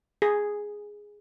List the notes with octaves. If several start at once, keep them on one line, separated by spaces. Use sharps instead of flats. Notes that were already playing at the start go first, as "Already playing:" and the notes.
G#4